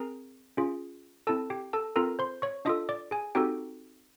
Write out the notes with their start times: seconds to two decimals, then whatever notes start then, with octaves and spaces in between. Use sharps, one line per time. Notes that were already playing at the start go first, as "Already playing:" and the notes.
Already playing: C4 G#4 A#4 A#5
0.57 C#4 F4 G#4
1.27 C4 E4 A4 A5
1.50 G4 G5
1.73 A4 A5
1.96 C4 F4 A4 A#4 A#5
2.19 C5 C6
2.42 C#5 C#6
2.65 D4 F4 A4 D#5 D#6
2.89 D5 D6
3.11 G#4 G#5
3.35 C4 D#4 F#4 G4 A4 G5